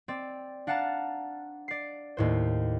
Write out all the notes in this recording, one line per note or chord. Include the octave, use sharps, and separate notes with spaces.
C4 D5
D4 F5 F#5 A5 A#5
D5 C7
D#2 A2 C5